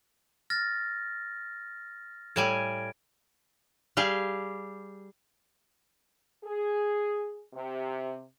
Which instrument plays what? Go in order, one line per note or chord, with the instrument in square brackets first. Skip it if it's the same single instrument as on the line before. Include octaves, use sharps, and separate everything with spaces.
[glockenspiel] F6 A6 A#6
[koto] A2 G3 G#5 [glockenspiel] G#6 D7
[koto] G3 G4 G#4 F5
[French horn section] G#4
C3